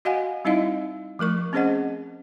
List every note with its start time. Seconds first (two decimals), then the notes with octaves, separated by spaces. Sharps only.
0.05 F#4 D#5 F5 F#5 G#5
0.45 G3 C4 D#4 E4 D#5 F5
1.19 F3 A3 A#4 C#6
1.53 C4 C#4 G#4 C5 D#5 F#5